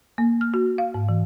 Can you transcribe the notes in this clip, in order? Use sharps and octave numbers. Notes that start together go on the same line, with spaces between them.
A#3
F6
F#4
F5
G#2
E3